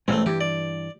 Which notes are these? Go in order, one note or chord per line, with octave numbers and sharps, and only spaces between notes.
A1 A#2 G#3 A3 C4
G2 E3 G4
D5